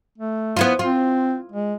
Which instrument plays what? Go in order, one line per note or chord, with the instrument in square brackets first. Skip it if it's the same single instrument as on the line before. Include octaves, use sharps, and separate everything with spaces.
[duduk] A3
[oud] B3 E4 F4
[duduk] C4 [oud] F4
[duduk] G#3